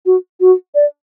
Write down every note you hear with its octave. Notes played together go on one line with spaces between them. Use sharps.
F#4
F#4
D5